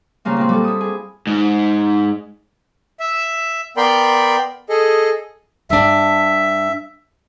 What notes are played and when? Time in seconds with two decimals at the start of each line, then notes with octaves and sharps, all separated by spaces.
0.25 C#3 G3 A#3 C4
0.37 A#2 A#3 C4
0.49 G3 A4
0.64 E4 D#6
0.81 G#4
1.27 G#2
3.00 E5
3.77 B3 A#4 D5 G5 B5 C6
4.69 G#4 A4 D#5
5.70 G2 D4 E5